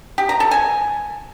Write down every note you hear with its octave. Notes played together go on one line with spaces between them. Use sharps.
G4
A#5
A4
G#5